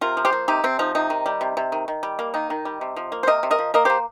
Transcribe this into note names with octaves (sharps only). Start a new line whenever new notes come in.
C3 F4 A#4
F3
G4 C5
A#3
C3 D#4 G4
C3 C4
F3 D#4
C3 D#4
D#3
G3
C3
C3
D#3
D#3
G3
A#3
D#3 D#4
D#3
G3
C3
F3
A#3
C5
C3 A#4 D#5
C3
A#4 D#5
F3
A#3 A#4 D#5
A#3 G4 C5